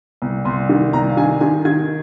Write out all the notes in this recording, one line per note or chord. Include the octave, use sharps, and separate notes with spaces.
C2
C2 C6
D#3
C2 A#5
F5
D#3 G#5
D#3 G#5
D#3 G#6